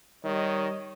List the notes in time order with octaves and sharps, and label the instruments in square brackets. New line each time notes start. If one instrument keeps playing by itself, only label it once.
[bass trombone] D#3 [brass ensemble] G3 C#5 D#5